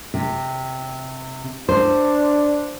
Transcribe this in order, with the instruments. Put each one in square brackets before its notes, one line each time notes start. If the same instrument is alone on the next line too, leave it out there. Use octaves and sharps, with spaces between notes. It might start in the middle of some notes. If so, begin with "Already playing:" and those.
[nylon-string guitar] C3
[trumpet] D4 [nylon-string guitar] C5